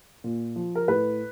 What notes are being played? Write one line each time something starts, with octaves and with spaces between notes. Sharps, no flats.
A#2
F3
A#4
A2 B4